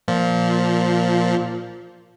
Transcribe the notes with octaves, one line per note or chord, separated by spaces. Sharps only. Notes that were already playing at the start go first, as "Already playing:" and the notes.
A#2 F3